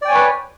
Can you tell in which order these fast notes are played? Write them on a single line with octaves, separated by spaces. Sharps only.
D5 G5 G#5 C#5 B4